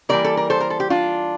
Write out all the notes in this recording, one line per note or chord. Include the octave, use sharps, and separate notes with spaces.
E3 G3 A#3 A#4 D5
A4
A#4
A4 C5
A#4
A4
G4
D4 F4